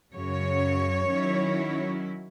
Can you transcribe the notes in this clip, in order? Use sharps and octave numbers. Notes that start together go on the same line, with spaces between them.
F#2 C#3 F#3 C#5
D#3 F#3 C#4 E4